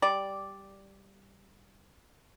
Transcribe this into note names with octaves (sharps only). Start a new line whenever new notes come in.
G3 D5